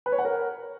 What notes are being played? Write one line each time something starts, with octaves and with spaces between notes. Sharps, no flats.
B4
C#5
F#5
A#4